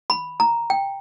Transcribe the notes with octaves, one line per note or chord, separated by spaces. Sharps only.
B5
A#5
G5